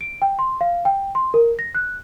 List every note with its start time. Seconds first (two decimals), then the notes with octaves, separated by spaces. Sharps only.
0.01 D7
0.22 G5
0.39 C6
0.61 F5
0.85 G5
1.15 C6
1.34 A#4
1.59 A#6
1.75 F#6